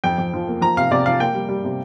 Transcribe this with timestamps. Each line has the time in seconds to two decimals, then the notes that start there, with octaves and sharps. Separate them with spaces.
0.04 F2 G5
0.18 F2
0.34 F3
0.48 A#3
0.62 F3 A#5
0.77 C3 F5
0.91 C3 D5
1.06 F3 F5
1.20 A#3 G5
1.34 G3
1.49 G3
1.64 C3